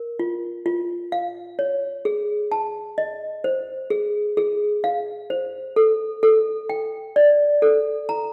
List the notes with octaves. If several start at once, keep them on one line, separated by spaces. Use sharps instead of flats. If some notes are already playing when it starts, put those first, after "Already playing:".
Already playing: A#4
F4
F4
F5
C#5
G#4
A5
D#5
C5
G#4
G#4
F5
C5
A4
A4
G5
D5
A4
A#5